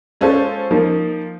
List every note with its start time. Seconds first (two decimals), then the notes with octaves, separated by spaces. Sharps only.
0.21 G#3 C#4 F4 A4 C5
0.71 F3 A#3 D#4